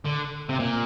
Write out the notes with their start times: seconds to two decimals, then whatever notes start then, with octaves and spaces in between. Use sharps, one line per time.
0.05 D3
0.49 C3
0.59 A#2